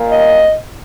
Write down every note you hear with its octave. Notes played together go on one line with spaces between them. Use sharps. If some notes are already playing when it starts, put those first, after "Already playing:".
Already playing: A#2 A#3
D#5